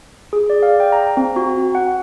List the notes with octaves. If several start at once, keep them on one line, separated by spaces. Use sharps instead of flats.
G#4
D5
F5
G5
A#5
C4
F#4
F#5